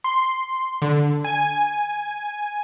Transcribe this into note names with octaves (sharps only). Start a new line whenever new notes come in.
C6
D3
G#5